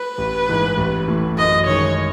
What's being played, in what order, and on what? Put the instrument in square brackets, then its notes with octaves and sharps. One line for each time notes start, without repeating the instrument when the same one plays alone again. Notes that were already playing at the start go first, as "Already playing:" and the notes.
Already playing: [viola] B4
[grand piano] A1
G#2 E3 G#3 D#4
A1
A2 E3
[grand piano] F#2 [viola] D#5
[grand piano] D#3 G#3 [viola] C#5